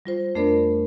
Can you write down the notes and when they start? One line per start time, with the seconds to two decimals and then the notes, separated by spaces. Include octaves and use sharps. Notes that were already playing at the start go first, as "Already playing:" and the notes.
0.06 G3 F4 C5
0.35 F2 A3 B3 D4 A#4 D5